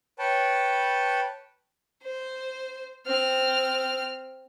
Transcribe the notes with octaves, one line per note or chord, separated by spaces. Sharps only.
B4 C#5 G5 A5
C5
C4 F6